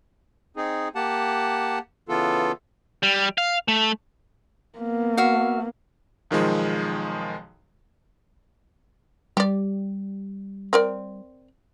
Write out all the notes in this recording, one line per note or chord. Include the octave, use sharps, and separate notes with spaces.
C4 D#4 G#4
A#3 G4 F#5 A5
C#3 E3 B3 F4 A4
G3
F5
A3
A#3 B3
F#4 E5 F5
B1 D#3 F3 G#3
G3 G4 D5
C4 A#4 D5